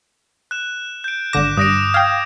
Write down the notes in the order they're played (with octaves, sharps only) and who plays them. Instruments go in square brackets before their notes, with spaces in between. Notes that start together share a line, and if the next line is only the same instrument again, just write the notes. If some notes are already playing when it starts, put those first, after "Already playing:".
[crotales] F#6 E7
G6 D7
[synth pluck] G#1 D3 A#6 [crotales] D6 E7
[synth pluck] G2 [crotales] D#6 A#6 D7
[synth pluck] F5 G5 [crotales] G#6